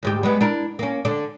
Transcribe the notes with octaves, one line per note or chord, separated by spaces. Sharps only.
D2 G#2 G4
G3 G#3 B3
D4 E4 A#4
A#3 C#4
D3 D4